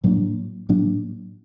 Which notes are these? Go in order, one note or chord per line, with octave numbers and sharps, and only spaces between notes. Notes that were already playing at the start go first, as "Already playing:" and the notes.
A2 F#3 A#3 D4
A2 F#3 A#3 D4